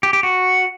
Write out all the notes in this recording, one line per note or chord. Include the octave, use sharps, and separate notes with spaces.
G4
G4
F#4